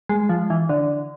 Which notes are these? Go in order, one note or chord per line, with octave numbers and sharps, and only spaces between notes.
G#3
F3
E3
D3